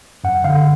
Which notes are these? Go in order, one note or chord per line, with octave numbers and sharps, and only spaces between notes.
F#2 F#5
D3 F5